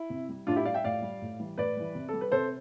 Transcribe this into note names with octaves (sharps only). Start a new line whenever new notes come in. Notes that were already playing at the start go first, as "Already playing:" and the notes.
Already playing: E4
C3
G3
A2 D4 F4
E4 G4
G3 D5 F5
E5 G5
A2 D5 F5
G3
A2
E3 G3
A2 B4 D5
E3 G3
C3
G3 A4
B4
C3 A4 C5